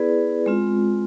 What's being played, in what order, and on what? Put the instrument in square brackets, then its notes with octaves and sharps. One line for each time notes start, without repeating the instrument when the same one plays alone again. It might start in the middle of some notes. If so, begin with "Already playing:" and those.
Already playing: [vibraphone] B3 E4 G#4 B4 D5
G#3 C4 F4